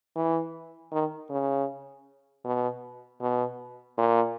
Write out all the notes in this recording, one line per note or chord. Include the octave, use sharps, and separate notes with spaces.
E3
D#3
C#3
B2
B2
A#2